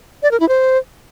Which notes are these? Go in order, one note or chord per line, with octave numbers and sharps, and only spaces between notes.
D5
A#4
E4
C5